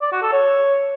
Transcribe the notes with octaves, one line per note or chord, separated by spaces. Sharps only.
D5
F#4
A4
C#5